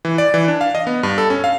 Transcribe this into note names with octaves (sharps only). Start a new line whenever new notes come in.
E3
D5
E3
D4
F5
D#5
B3
G2
A4
C#4
F5